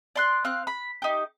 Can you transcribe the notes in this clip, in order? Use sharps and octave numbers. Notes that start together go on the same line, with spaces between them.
D5 C6 F#6
C4 F5 F#6
B5
D#4 G4